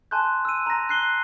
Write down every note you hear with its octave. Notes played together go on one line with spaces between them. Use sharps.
G#5 A5 C6 F#6 G6
E6 D#7
A#5 A#6
F#6 C7 G7